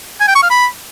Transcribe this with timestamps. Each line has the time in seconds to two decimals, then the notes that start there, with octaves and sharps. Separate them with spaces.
0.21 G#5
0.28 G5
0.36 C#6
0.43 F5
0.50 B5